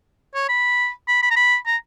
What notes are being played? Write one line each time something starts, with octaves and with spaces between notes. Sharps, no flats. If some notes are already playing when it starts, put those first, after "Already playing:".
C#5
B5
B5
B5
A#5
B5
A#5